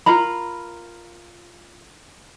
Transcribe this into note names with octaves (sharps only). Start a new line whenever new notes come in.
F4 A#4 A#5 B5